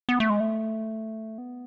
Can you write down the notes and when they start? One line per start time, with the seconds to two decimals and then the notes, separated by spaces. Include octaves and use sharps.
0.09 B3
0.20 A3
0.30 G#3
0.40 A3
1.38 B3